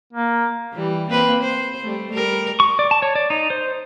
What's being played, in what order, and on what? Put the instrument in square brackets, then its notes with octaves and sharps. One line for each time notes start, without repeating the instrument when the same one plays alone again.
[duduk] A#3
[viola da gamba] E3 G3
A#3 C4 B4
C5
G3 A3
G3 A#4
[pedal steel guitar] C#6
D5
A5
C#5
D5
D#4
C5